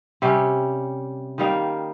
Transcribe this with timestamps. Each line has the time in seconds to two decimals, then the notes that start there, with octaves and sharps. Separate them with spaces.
0.22 C3 G3 C#4
1.38 D#3 G3 A#3 D#4